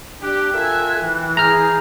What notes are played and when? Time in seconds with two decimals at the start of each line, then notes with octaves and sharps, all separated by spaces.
0.21 D4 G4 G5 F#6
0.53 F4 A4 A#4 E5 G#5
1.01 E3
1.37 G#4 A#5 F6 G6